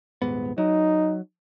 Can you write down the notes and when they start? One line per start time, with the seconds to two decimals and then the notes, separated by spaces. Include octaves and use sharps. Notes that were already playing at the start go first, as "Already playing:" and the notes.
0.22 D#1 G#2 B3
0.58 F#3 D#4